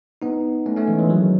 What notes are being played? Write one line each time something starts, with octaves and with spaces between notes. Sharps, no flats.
B3 D#4
A3 C#4
A3 C#4
E3 G#3
E3 G#3
D#3 F#3